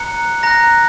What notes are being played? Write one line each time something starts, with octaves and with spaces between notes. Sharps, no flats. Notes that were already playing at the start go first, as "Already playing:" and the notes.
Already playing: A#5 F#6 C#7
A#5 F#6 A#6